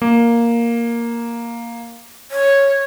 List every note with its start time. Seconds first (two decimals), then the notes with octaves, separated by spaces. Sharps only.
0.02 A#3
2.31 C#5